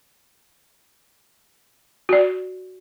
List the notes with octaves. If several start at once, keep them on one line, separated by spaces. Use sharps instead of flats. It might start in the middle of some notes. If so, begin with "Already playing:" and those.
F#4 D5